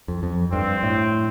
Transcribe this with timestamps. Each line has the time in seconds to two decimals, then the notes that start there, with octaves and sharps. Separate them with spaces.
0.08 F2
0.23 F2
0.53 G2 C4
0.83 A2